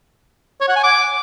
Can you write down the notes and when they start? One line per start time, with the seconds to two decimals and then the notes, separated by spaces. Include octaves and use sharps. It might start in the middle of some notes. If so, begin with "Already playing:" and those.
0.61 C#5
0.68 F#5
0.76 G#5
0.83 D6